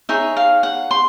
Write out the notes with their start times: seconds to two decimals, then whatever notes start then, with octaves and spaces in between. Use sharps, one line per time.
0.09 D#4 G#4 C#5 E5
0.37 F5
0.63 F#5
0.91 C6